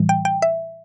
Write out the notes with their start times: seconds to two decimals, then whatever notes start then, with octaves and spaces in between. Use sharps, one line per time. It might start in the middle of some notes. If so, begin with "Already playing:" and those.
Already playing: A2 E3 G3
0.09 G5
0.25 G5
0.42 E5